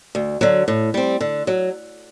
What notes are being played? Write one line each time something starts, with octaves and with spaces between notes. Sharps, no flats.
D2
D3 F#3
A2
G3 C4
D3
F#3